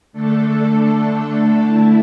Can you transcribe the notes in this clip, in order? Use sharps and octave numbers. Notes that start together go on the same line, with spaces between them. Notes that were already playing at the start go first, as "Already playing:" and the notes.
D3 A3 D4 A4
D3 A3 E4